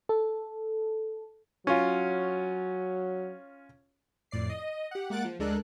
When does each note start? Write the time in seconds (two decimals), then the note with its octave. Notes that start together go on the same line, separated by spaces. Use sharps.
0.09 A4
1.67 F#3 C#4 F4
4.31 F2 A2 D5 C7
4.50 D#5
4.91 G4 F#5
5.10 G#3 A#3 F#5 F#6 A6 D7
5.25 F3
5.39 D2 G#3 D4 A4 A#4 F#6